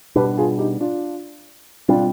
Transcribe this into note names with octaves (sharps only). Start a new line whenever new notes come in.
B2 G3 D4 G4 B4
F4 G#4
D#4 G4
D4 F4
B2 G3 C4 D4 F4